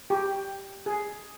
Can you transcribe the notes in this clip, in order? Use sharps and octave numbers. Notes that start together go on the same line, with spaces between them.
G4
G#4